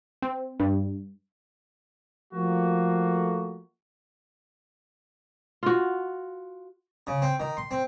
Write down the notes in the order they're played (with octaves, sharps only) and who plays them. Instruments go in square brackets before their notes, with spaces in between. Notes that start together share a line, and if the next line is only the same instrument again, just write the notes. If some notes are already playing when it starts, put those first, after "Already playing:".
[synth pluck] C4
G2
[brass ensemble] F3 A3 A#3 F#4
[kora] F4 F#4
[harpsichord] C#3
C4
D#3
C6
C4